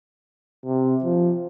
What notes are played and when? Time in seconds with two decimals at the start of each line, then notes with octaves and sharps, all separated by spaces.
0.65 C3
1.04 F3